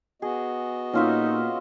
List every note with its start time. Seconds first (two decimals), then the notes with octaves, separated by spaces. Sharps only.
0.22 B3 F#4 G#4 D#5
0.93 A#2 C#4 D#4 F4 E5